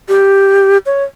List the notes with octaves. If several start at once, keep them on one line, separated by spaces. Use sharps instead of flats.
G4
C#5